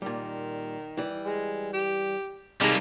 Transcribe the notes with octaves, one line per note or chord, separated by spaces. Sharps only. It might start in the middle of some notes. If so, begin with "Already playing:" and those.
A#2 D#3 G3
E3 G3
G#3
G4
C3 G3 G#3 A#3 D#4 A4